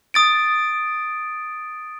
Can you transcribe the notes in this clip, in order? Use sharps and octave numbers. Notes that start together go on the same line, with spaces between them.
D#6 A6 D7